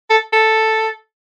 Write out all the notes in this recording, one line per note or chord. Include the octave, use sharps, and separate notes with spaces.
A4
A4